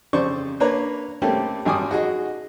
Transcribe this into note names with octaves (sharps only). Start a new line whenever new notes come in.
F2 C#3 C5 D5 C#6
A#3 D4 B4 C#5 A#5
G3 A3 A#3 C4 C#4 G4
G#1 F#2 G3 G#5 D6 D#6
D#4 F#4 G#4 D#5